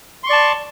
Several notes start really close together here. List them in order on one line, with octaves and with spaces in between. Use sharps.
C6 C#6 D5 A5